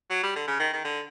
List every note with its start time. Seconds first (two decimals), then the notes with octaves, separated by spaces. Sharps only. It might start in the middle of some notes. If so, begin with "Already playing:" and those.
0.10 F#3
0.23 G3
0.36 D3
0.48 C#3
0.60 D#3
0.73 D#3
0.85 D3